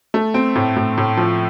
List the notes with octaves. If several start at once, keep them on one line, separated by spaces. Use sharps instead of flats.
A3
C4
A2
A2
A2
F3